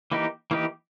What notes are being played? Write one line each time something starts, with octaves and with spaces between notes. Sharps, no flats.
E3 A#3 D#4 G4
E3 A#3 D#4 G4